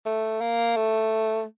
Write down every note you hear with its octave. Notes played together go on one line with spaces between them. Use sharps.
A3
A#3
A3